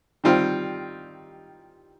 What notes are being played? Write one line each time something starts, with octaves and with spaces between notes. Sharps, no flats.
D#3 G3 C4 F4